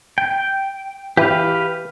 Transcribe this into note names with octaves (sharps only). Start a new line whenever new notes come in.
G5
E3 G4 B4 F5